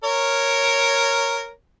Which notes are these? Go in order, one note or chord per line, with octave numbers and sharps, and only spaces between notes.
A#4 C#5